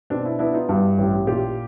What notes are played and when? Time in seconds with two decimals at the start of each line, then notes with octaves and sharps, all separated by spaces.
0.10 B2 C4 D4
0.25 D4 E4
0.39 B3 D4 E4
0.54 D#4 F4
0.68 G2 E4 F#4
0.98 A1
1.27 A#2 F4 G4